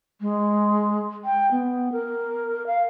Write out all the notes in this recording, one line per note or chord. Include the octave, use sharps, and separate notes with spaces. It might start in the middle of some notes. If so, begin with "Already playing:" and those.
G#3
G5
B3
A#4
F5